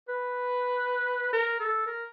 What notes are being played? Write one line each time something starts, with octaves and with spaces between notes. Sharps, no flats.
B4
A#4
A4
A#4